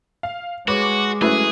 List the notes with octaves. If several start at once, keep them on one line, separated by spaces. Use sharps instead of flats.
F5
G#3 F#4 B4 C#5 D6
F#3 A3 C#4 E4 G#4 B4 F#6